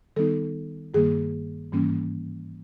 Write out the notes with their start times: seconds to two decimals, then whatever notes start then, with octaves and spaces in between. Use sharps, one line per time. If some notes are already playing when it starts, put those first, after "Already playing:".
0.16 D#3 G3 B3 D#4 A4
0.94 G2 D#3 G3 A#3 G#4
1.72 G#2 E3 G3 A#3 C#4